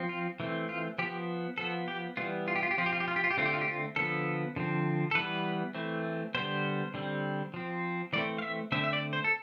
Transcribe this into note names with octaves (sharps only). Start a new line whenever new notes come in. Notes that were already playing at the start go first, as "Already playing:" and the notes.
Already playing: F3 C4
F4
E3 A3 C4
F4
F3 B3 G4
F3 B3 A4
G4
E3 G3 B3 F4
F4
G4
F4
G4
F3 C4 F4
G4
F4
G4
F4
G4
F4
G4
D3 A3 C4 F4
G4
F4
G4
F4
D3 F3 B3 A4
D3 F3 C4
A4
E3 G3 B3 B4
E3 A3 C4
D3 G3 B3 C5
D3 G3 C4
F3 C4
E3 A3 C4 D5
F5
E5
D3 A3 C4 E5
E5
D5
C5
A4